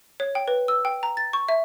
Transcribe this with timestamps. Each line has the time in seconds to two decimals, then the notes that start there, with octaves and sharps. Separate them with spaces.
0.20 C#5
0.35 G5
0.48 B4
0.68 E6
0.85 G5
1.03 A#5
1.17 A6
1.33 C#6
1.48 E5